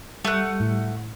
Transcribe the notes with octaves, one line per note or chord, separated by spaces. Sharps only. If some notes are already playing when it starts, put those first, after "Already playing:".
G3 A3 F#5
A2